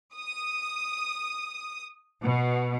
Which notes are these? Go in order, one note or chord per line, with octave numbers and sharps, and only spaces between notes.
D#6
B2